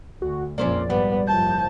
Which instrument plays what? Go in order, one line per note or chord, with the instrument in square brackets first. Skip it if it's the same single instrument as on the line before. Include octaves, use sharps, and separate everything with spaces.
[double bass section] D2 [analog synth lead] F#4
[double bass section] A#1 F2 [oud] A#3 C4 C#4 [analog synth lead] D5
[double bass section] G#2 [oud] G3 [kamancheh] B3
[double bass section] F#1 F#2 F3 [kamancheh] A5 [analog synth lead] G6